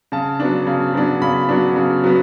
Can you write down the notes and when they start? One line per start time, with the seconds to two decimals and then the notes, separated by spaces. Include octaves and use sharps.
0.12 C#3 A5
0.40 F#3 B3 D4
0.67 C#3
0.94 F#3 B3 D4
1.21 C#3 B5
1.49 F#3 B3 D4
1.76 C#3
2.04 F#3 B3